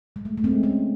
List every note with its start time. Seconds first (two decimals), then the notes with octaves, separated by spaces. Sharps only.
0.16 G#3
0.25 A3
0.38 A3
0.44 G#3 C4
0.63 A3 C#4